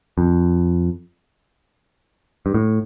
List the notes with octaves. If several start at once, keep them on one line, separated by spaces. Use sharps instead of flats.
F2
G2
A2